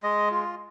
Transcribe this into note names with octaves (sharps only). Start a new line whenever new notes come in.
G#3 D#5
F4